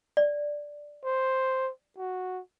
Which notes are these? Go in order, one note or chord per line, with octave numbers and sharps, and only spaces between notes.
D5
C5
F#4